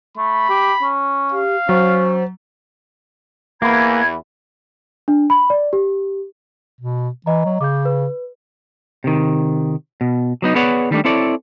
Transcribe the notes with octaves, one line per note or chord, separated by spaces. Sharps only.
A3 B5
G4
C#4
G4 F5
F#3 C#4 C5
E2 E3 A#3 F#4 B4 B5 G#6
D4
B5
D5
G4
B2
E3 D#5 A#5
F#3
C#3 D6 G6
B4
C3 D#3
B2
F#3 B3 D#4
B3 G#4 B4 C#5 D5 F#5
D#3 G3 A3 D4
C4 E4 A4 C#5 D5